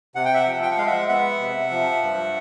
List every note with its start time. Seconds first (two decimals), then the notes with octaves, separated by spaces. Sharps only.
0.15 C3 F#5
0.25 G5
0.34 E5 F#5
0.46 F3
0.62 G5
0.70 F#5
0.78 G#3 F5
0.86 E5 F#5
1.08 B3 E5 F#5
1.40 C3
1.71 F3
2.02 G2